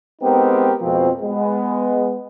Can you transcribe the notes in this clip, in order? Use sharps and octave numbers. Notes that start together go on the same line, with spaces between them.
G#3 B3 C4 D#4 G4 A#4
F2 B2 F3 G#3 C4
G#3 B3